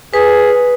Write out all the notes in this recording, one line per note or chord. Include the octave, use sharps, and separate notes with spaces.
G#4 B4